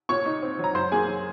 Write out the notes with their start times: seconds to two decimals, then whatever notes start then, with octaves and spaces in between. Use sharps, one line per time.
0.09 A#2 C#5 C#6
0.26 D#4
0.42 C4
0.59 F#3
0.64 A#5
0.74 F#2 C5 C6
0.92 A#3 G#4 G#5
1.08 F#3